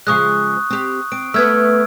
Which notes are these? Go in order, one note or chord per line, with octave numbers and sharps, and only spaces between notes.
C#3 F3 G#3 C#6 D#6 F#6
C4 G4
C4 D7
A3 B3 B4 E6 F6 G#6